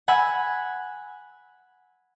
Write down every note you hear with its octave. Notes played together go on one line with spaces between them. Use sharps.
F#5 G#5 B5 E6